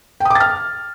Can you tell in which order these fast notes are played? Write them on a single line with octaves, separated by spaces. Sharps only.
G5 D#6 D6 A6 F6